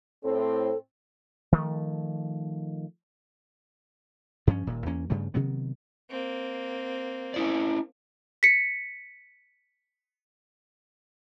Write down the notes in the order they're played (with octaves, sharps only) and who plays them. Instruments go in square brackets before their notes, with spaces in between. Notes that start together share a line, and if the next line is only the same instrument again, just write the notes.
[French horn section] A2 C4 [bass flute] A4
[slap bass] D#3 F3 A3
G2 F3 C4 C#4
D#1 A#2
E2 A#3 C#4
G2 C#3 G3 A3
C3 D#3 F#3 B3
[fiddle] A#3 C4
[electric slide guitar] C#4 E4 D5
[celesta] B6 C#7